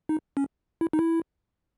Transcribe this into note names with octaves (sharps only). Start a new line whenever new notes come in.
D#4
C#4
E4
D#4
E4